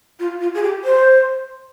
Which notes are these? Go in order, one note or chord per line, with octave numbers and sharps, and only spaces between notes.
F4
F4
G#4
G4
C5